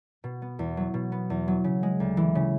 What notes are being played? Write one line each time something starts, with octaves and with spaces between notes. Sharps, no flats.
B2
B3
E2
F#3
B2
B3
E2
F#3
C#3
G#3
D2
E3
C#3